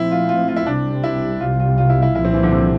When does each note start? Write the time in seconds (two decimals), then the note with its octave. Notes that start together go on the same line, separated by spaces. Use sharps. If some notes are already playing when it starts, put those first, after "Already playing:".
Already playing: A#2 F3 A3 C4 E4
0.11 F4
0.29 F4
0.48 F4
0.56 E4
0.66 C2 C3 G3 C4 D4
1.04 E4
1.40 C2 C3 G3 F4
1.60 F4
1.78 F4
1.90 E4
2.02 E4
2.15 C2 A#2 F3 E4
2.25 C4
2.33 E3
2.43 D3
2.52 C3